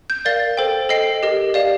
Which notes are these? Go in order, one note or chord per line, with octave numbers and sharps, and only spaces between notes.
G6
A#4 D5 F5 A6
A4 C5 G5
A4 D#5 G5 C7
G4 A#4 D#5
G4 D5 F5